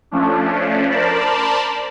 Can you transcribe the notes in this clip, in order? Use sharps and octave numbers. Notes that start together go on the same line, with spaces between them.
F3 A3 C#4 D4
A#4 C5 D5 A5 B5